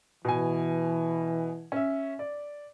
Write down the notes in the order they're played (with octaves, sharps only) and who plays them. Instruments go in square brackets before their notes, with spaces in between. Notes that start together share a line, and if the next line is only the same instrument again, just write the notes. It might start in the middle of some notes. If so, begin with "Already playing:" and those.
[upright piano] B2 G#5 [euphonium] E3
[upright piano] C#4 E5
D5